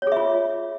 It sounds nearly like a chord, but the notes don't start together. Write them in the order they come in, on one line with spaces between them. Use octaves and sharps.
C#5 G#4 E5 F4